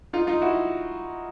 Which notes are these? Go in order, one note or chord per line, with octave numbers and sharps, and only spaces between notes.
D#4 F4
D#4 F4
E4 F#4